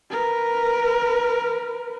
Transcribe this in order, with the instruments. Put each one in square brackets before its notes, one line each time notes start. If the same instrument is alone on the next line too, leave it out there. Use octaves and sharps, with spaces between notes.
[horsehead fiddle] A#4 B4